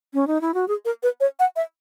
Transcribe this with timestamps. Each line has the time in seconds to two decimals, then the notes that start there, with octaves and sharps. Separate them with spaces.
0.14 C#4
0.27 D#4
0.41 E4
0.54 F#4
0.68 G#4
0.85 A#4
1.03 B4
1.20 C#5
1.39 F#5
1.56 E5